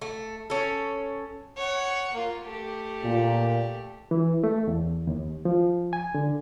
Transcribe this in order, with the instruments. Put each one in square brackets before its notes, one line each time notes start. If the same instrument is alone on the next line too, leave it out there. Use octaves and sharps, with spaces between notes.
[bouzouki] A3
C#4 A4
[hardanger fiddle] C#5 F#5
A#3 F4
A3 G4
[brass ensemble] A#2
[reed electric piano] E3
A3
E2
D#2
F3
G#5
D3